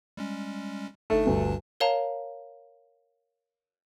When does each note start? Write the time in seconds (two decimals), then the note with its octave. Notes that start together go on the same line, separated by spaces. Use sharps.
0.17 G3 G#3 C#4
1.10 G1 A3 D4 D#4 A5
1.26 D2 G2
1.80 A#4 C#5 F5 A5 A#5